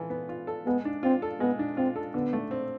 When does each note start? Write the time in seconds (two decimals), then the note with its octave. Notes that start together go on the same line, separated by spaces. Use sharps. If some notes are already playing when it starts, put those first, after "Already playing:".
Already playing: E3 F4 A4
0.10 B3
0.29 F4
0.47 A4
0.66 G#3 B3
0.85 D4
1.03 C4 F4
1.22 A4
1.40 G#3 B3
1.59 D4
1.77 C4 F4
1.96 A4
2.14 D3 B3
2.33 A3
2.51 C4